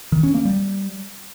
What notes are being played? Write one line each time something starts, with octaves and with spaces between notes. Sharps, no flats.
D#3
C#4
A#3
G3